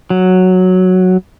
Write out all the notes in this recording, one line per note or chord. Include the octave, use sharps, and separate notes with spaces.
F#3